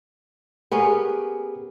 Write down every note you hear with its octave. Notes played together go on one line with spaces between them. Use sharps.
B3 C#4 G4 G#4 A#4